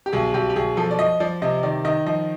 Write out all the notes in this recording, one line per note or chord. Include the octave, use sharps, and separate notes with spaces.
G4
B1 G#4
B1 G4
G4
B1 G#4
F3 A4
D5
F3 D#5
F3 D5
C3 D#5
D#3 D5
D#3 D#5
F3 D#5